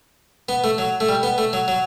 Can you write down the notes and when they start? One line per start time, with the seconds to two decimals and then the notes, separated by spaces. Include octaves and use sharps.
0.49 B3
0.64 A3
0.78 F#3
1.00 A3
1.09 G3
1.23 B3
1.38 A3
1.53 F#3
1.68 F#3